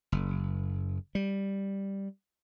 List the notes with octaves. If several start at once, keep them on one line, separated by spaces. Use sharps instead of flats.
F#1
G3